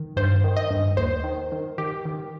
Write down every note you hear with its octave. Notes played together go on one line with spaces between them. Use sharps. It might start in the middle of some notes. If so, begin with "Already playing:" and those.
Already playing: D#3
G2 C5
D#3
D#5
G2
D#2 C5
D#3
D#3
D#3 G4
D#3